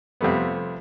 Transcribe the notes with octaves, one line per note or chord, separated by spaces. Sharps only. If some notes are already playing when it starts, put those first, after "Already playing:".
F2 C3 G3 A3 B3